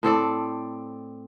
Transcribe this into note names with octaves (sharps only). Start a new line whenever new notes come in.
A2 C4 A4 D5